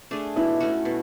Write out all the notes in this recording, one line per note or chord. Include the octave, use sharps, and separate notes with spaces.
A3 D4 G#4
B2 E4
A3 C#4 F#4
B2